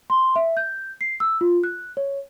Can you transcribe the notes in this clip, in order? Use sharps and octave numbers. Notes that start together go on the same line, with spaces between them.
C6
E5
G6
C7
E6
F4
F#6
C#5